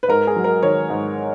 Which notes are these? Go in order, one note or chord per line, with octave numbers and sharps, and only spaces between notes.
B4
G#2 A#4
G#4
F#3
A#4
D#3 C#5
G#2